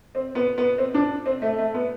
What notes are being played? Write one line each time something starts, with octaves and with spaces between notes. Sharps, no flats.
C4
B3
B3
C4
D4
C4
A3
A3
B3